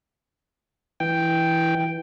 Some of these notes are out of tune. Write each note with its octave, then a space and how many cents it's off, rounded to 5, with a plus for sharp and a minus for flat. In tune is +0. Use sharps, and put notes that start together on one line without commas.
E3 +0 G5 +0